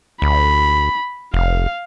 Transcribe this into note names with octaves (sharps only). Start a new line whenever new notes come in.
D2 B5
F1 F5